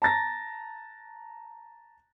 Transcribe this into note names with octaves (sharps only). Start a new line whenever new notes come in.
A5 A#5 A6 A#6